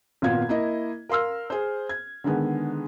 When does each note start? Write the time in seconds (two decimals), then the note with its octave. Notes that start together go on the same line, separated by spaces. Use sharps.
0.22 G#1 A#2 B3 F4 F5 G#6
0.49 A#3 E4 D#5
1.09 A#4 F5 C6 E6 F6
1.50 G#4 C5
1.89 G#6
2.24 D3 D#3 G#3 B3